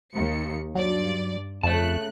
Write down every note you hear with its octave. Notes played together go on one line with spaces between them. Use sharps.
D#2 C#7
G2 F#3 D5
F2 C#3 A3 A5 F#6